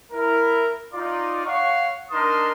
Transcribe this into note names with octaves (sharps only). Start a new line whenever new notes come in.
E4 A#4
D#4 F4 D5
C#5 F5 F#5 C#6
D4 D#4 A#4 A5 C6 D#6